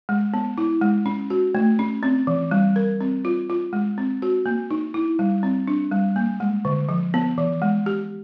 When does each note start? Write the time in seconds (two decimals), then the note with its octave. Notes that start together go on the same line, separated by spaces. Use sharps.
0.09 G#3
0.34 B3
0.58 E4
0.81 G#3
1.06 C#4
1.30 F#4
1.55 A3
1.79 C#4
2.03 C4
2.27 E3
2.51 G3
2.76 A#4
3.01 C4
3.25 F4
3.50 F4
3.73 G#3
3.98 C4
4.22 F#4
4.46 A#3
4.71 D#4
4.94 E4
5.19 G3
5.43 C4
5.68 D4
5.92 G3
6.16 A#3
6.40 G#3
6.65 D3
6.89 F3
7.14 B3
7.38 E3
7.62 G#3
7.86 G4